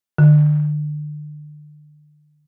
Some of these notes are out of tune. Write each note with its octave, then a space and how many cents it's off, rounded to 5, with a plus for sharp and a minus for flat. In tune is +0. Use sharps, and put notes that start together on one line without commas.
D3 +35